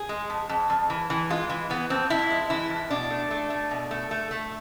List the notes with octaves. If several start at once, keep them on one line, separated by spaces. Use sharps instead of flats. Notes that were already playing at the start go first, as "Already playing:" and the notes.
Already playing: G#4
G#3
F2
F2
F2
E3
E3
G#3 F4
E3
E3 B3
F2 C4
F2 E4
G#3
E3 E4
F2
B2 D4
A3
A3
A3
B2
A3
A3
A3